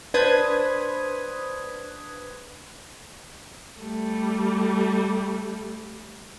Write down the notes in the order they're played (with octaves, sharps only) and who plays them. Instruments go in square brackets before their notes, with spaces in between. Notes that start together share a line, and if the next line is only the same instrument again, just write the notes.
[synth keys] D4 B4 C5 D#6 G#6
[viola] G3 A3